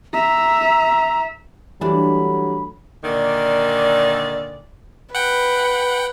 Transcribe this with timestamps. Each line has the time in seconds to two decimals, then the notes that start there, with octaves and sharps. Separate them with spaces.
0.13 E5 A#5
1.81 E3 F#3 G3 A3 D4 B5
3.04 A#2 D3 D#3 A#3 D5
5.15 B4 F#5 G5